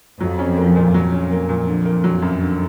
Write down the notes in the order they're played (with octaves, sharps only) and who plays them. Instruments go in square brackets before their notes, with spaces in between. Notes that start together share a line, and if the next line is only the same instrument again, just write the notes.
[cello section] F2 [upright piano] F#3
[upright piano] C#4
A#3
A#2
[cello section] F2 [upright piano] F#3
[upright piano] C#4
A#3
A#2
D3
A#3
F#3
F#2
D3